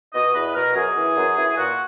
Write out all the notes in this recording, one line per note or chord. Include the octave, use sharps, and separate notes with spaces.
B2 D#5
E2 B4
B2 A#4
F#2 G#4
E3
F#2
E3
A#2 F#4